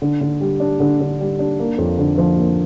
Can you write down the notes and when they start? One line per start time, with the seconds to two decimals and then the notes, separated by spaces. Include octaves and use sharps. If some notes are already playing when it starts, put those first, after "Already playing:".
0.02 D3
0.21 D3
0.41 G3
0.60 D4
0.80 D3
1.00 D3
1.20 G3
1.39 D4
1.59 A#3
1.78 F2
1.99 D3
2.18 F3
2.38 A#3